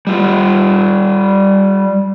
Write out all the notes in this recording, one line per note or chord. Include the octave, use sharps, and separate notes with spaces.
G3 F4